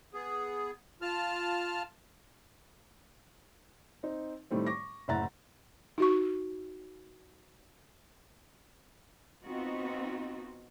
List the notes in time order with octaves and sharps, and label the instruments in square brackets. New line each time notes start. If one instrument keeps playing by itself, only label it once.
[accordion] B3 G#4
F4 A5 F6
[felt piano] C4 D#4
A2 D#3 G3 A3 C4
C#6 D6 A#6
F#1 A2 E5 F#5 A#5 A6
[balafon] D#4 F#4 C#6
[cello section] B3 C4 D#4 F4 F#4